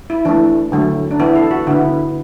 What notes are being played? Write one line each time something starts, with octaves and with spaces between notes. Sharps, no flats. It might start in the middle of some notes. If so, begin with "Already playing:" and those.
E4
E3 A3 D4
D3 F#3 A3
D4
E3 B3 E4
A4
F#4
D3 B3 E4